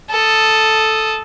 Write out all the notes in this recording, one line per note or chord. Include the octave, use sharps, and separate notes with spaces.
A4 D#6